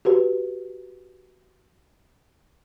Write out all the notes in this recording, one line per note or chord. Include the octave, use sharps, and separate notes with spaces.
F#4 G4 B4